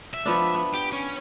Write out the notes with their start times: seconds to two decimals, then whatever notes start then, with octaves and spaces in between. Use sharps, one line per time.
0.14 E5
0.25 F3 B3 D4
0.54 B3
0.74 G4
0.92 C#4